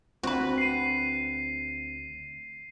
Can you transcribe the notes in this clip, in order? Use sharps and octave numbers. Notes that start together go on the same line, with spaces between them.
D2 C4 F#4 B4
C7 D#7